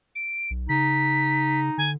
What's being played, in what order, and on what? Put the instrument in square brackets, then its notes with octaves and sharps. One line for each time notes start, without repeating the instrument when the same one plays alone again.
[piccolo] D7
[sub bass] B1
[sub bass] C#3 [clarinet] D#4 [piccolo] B6
[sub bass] D3 [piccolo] G#5